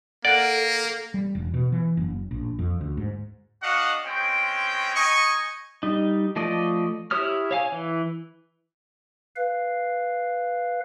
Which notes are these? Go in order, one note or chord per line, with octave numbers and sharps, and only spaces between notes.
A#3 A4 D5 F#5 F#6
G3
E1
B2
E3
F#1
A#1
F2
D2
G#2
D4 F#4 D#5 F5 F#5
G#3 C4 C#4 G5
D#4 D#5 G#5 C#6
G3 D#4
F3 A3 D5 D#5
E4 G4 C#5 D#6 F6
C#5 F5 G#5
E3
B4 F5